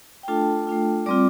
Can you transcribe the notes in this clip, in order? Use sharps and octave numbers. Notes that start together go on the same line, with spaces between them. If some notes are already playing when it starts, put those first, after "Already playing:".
G5
A3 D4 F4 A4 A5
A3 D4 F4
G3 C4 F4 D5 D6